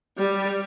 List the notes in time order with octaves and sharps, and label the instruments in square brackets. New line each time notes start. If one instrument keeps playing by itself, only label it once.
[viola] G3